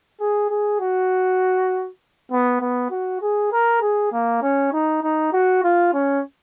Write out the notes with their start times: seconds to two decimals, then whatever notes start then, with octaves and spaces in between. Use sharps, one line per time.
0.21 G#4
0.50 G#4
0.80 F#4
2.32 B3
2.61 B3
2.91 F#4
3.22 G#4
3.53 A#4
3.82 G#4
4.12 A#3
4.42 C#4
4.73 D#4
5.03 D#4
5.33 F#4
5.64 F4
5.94 C#4